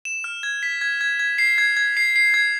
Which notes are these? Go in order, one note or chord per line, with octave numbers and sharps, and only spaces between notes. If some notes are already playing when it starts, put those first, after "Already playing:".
E7
F6
G#6
B6
G#6
G#6
G#6
C7
G#6
G#6
C7
C7
G#6